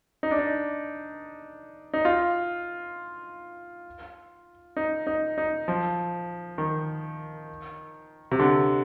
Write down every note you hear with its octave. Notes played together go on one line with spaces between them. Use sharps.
D#4
D4
D#4
D#4
F4
D#4
D#4
D#4
F3
D#3
C3
D3